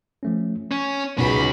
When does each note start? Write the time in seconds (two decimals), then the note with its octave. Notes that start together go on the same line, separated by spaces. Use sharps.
0.23 F3 A3 C#4
0.71 C#4 G#6
1.18 C#2 B2 C#4 D#4 F#4 B4 B5